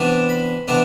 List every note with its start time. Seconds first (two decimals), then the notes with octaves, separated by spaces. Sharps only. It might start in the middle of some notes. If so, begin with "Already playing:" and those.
Already playing: C3 E3 B3 D4 A5
0.29 B5
0.68 C3 E3 B3 D4 A5